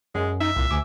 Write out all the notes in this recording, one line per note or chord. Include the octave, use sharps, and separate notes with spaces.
F#2 G#3
D#4 E5
C2 A#2
D2 G#5 D6